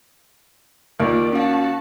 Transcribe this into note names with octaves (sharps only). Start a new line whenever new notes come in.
D#2 F4 A#4 D5 D7
C#4 F#4 F5 A5